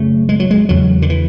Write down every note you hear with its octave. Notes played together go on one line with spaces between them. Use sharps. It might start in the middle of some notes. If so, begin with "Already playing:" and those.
Already playing: F#2 C#3 A3
G#3
F#3
G#3
E2 C#3 F#3
D3
E3